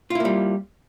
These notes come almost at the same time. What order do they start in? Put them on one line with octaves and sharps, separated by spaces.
F4 E4 A#3 G3